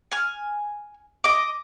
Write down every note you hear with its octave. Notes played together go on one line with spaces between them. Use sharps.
G#5 F6
D#5 D6